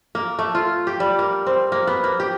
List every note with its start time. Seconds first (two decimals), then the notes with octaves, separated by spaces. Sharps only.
0.15 A#3
0.39 A3
0.55 F4
0.87 G4
1.00 G3
1.19 A#3
1.46 C4
1.72 A#3
1.87 B3
2.04 A#3
2.20 G4